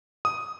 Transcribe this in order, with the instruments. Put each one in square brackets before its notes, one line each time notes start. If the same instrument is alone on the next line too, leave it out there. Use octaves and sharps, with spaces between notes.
[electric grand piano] D#6